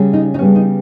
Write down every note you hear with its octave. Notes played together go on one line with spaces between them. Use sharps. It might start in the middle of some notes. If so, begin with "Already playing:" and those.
Already playing: C#3 G3 C#4
D#4
D#4
C#3 G3 B3 C#4
D#4